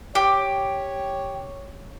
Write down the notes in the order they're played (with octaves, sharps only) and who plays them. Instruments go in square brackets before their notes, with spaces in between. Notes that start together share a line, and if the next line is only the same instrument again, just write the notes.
[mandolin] G4 [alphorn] C#5